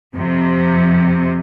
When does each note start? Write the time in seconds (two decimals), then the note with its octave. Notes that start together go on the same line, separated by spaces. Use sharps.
0.14 F2 C3